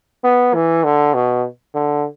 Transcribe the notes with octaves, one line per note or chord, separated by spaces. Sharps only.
B3
E3
D3
B2
D3